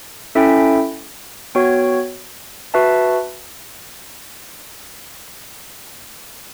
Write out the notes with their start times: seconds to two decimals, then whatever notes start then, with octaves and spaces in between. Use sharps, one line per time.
0.35 C#4 E4 A4 E5 G5
1.55 B3 F#4 C#5 G5
2.74 F#4 B4 E5 A5